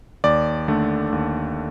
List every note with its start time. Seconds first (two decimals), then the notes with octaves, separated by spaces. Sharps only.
0.24 D#2 D5
0.68 D3 A3
1.12 D#2